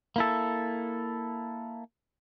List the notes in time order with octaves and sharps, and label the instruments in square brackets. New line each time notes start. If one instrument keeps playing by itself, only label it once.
[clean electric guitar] A#3 E4 A4